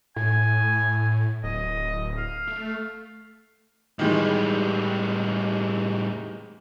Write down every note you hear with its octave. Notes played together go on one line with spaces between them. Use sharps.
A2 G#5
D1 D#5
F5
A3
A2 D#3 E3 G3 G#3